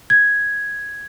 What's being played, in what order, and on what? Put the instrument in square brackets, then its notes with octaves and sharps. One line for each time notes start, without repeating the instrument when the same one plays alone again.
[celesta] G#6